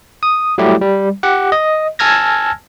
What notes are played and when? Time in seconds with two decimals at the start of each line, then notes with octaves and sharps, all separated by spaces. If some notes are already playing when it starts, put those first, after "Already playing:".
0.23 D#6
0.58 F#3 G3 A3 E4 G4
0.81 G3
1.23 G4 F#5
1.52 D#5
1.99 G#5 A5 E6 F6 G#6 A#6